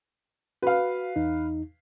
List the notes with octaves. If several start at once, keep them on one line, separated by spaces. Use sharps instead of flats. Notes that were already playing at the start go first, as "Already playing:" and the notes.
F#4 B4 F5
E2 D#4